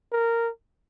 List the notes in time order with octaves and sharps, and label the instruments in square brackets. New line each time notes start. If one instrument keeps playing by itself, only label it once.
[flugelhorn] A#4